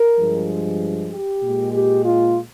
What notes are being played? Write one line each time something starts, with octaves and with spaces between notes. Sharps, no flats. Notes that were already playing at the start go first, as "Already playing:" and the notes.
Already playing: A#4
G2 F3 G#3
G4
A#2 G#3
G4
F4